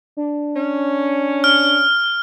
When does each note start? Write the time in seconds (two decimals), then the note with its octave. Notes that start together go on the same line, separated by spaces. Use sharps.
0.17 D4
0.55 C#4
1.44 F6